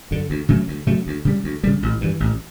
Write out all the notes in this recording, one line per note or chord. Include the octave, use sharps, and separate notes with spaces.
F#2 D3
D2
C#3 F#3 A3
D2
C#3 F#3 A3
D2
C#3 G3
D2
C#3 G3
A1
G2 E3
A1